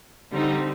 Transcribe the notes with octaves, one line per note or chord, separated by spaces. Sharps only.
D3 G3 C4 D#4